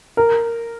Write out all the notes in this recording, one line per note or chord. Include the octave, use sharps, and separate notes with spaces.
A#4